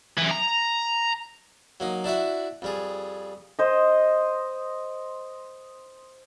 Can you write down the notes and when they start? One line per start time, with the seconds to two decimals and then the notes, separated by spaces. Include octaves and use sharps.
0.17 F#2 E3
0.31 A#5
1.80 F#3 A#3 D#4
2.04 D4 E4 F#4 E5
2.62 F2 G3 G#4
3.59 C5 D#5